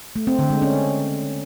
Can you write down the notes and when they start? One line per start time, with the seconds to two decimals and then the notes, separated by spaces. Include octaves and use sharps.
0.16 A3
0.27 C4
0.39 D3
0.50 G#3
0.62 C#4